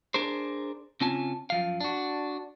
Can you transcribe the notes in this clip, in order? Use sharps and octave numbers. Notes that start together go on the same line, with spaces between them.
D4 G#4 A#4 C5
C#3 C4 C#4 F4 G#5 A5
F#2 F3 F5
D4 F#4